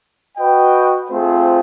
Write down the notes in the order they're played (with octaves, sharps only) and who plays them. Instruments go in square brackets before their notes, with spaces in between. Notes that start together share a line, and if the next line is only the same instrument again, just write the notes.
[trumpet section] F#4 B4 D#5 G5
A3 C4 F4 G#4 C5